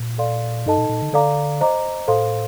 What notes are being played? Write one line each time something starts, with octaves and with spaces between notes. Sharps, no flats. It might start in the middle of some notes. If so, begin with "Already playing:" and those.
Already playing: A#2
A4 D5 F5 C6
G2 D#4 A4 D#5 A5
A#2
A#2
D3
D3 A4 D5 F5 A#5 D6
C5 D#5 A#5 D6
A2 A4 C5 F5 C6